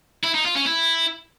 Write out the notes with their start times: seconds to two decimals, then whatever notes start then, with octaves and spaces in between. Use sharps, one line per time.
0.23 E4
0.34 D#4
0.45 F4
0.55 C#4
0.66 E4